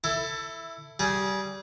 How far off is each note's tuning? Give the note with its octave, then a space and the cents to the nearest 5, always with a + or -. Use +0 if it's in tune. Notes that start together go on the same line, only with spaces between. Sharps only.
E4 +0 A4 +20
G3 -20 G#4 +0